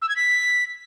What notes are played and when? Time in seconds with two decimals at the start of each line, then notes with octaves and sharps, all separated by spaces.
0.02 E6
0.09 G#6
0.16 B6